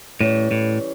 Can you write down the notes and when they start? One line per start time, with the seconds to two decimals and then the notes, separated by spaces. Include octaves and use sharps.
0.20 A2 E3 G3 C#4
0.51 A2